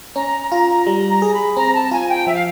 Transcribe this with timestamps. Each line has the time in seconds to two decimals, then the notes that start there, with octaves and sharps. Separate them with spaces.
0.16 C#4 A#5
0.51 F4 A#5
0.87 G3 A#5
1.10 A#5
1.22 G#4
1.34 B5
1.57 C4 A#5
1.74 A5
1.91 F4 G#5
2.09 G5
2.26 F3 E5
2.34 F5